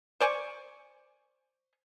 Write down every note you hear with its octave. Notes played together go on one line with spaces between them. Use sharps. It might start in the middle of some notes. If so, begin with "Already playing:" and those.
C5 D5 G#5 C#6